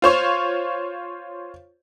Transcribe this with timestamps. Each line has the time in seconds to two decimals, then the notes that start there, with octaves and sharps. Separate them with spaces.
0.02 F4 C5 C#5